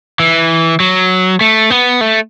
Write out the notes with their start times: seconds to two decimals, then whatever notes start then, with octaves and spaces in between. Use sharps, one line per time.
0.20 E3
0.80 F#3
1.41 A3
1.70 B3
2.01 A3